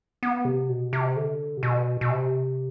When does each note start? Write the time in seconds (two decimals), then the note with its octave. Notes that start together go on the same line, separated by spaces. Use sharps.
0.23 B3
0.45 C3
0.69 B2
0.93 C3
1.16 D3
1.57 C3
1.63 B2
2.01 B2
2.10 C3